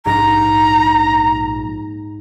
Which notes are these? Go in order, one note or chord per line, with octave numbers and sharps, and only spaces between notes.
A#1 G#2 A#5